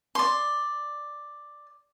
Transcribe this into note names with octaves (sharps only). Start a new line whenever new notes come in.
D5 C6